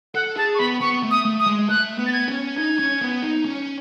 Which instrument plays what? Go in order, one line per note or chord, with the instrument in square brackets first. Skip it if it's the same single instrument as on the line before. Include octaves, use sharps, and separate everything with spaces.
[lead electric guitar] A4 [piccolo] F#5
[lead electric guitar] G#4 [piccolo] A5
[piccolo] C#6
[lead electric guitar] B3 [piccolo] B5
[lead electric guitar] B3 [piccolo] C#6
[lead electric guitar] A3
[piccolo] D#6
[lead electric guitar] A3
[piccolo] D#6
[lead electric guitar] G#3
[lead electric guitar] A3 [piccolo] F#6
[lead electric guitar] B3
[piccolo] A6
G#6
[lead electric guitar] C#4
[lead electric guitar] D#4 [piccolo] G#6
[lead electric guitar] C#4
B3
D#4
C#4